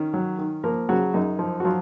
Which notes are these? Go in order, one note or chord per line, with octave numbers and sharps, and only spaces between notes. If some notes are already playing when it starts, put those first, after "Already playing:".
Already playing: D#3 C#4
F#3
D#3
F3 A#3 A#4
C#3 F#3 F#4
F#2 D#4
F3
F#4
F3 F#3 F4